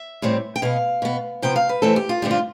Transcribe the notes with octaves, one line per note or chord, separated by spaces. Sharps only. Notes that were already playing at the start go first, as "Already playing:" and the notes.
Already playing: E5
A2 E3 G3 C4
G5
B2 B3 F5
B2 B3
C3 F3 B3 G5
F5
B4
F2 E3 A3 C4 A4
G4
F4
G2 D3 A3 C4 G4
F4